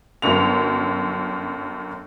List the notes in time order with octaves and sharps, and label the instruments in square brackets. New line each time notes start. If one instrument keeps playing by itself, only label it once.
[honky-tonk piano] G1 F#2 F7